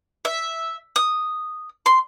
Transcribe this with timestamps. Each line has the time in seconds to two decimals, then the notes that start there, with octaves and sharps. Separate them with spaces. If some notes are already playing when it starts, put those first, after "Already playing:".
0.25 E5
0.96 D#6
1.86 C6